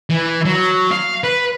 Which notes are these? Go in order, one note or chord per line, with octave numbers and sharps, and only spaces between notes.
E3
F#3
F5
B4